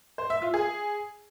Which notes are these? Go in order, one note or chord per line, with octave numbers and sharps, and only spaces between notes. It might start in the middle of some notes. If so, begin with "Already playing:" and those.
C5
E5
F4
G#4